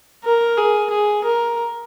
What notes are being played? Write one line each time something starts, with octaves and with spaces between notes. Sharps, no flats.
A#4
G#4
G#4
A#4